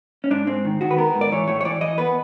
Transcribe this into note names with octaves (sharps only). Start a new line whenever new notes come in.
C#4
G#2 D4
G#2 C4
D#3
D#3 F#4
B4
B3 A#4
G#2
D5
E3 C#5
A2 C#5
C#5
E3 D5
E3 D#5
B3 B4